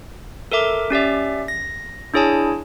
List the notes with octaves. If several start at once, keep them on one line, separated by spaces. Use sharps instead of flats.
A4 A#4 E5 D6
C#4 G4 D5 E5
A#6
D4 E4 G#4 C#5 G#5 A5